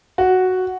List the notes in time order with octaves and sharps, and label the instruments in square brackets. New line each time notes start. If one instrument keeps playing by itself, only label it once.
[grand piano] F#4